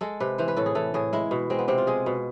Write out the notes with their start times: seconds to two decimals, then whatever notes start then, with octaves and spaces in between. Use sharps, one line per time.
0.01 G#3 A4
0.20 C3 B4
0.38 E3 C5
0.48 B4
0.56 A2 A4
0.66 G#4
0.75 E3 A4
0.94 A2 G#4
1.13 G#3 E4
1.31 B2
1.50 G#3 C4
1.59 B3
1.68 C3 C4
1.78 F4
1.87 G#3 G#4
2.06 B2